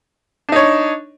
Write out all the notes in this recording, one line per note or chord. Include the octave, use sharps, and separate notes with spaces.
D4 D#4 C#5